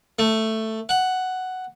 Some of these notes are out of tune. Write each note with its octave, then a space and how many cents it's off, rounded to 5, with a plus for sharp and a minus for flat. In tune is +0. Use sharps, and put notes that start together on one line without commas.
A3 +5
F#5 +5